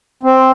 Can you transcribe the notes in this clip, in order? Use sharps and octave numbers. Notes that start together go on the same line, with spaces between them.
C4